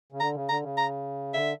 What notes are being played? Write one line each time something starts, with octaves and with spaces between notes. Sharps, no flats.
C#3
D3 A#5
C#3
D3 A#5
C#3
A#5
D3 E5